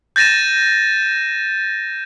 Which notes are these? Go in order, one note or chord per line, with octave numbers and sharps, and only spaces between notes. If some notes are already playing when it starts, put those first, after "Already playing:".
G6 A6 A#6 D#7 E7